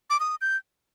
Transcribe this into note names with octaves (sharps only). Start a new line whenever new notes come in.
D6
D#6
G6